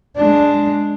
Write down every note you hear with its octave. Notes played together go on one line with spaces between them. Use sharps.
G#3 D4